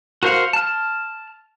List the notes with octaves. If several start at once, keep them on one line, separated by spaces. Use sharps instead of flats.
F#4 A#4 C5 F5 F#5
A5 F6